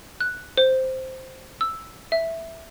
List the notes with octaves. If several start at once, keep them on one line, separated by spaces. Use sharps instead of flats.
F#6
C5
E6
E5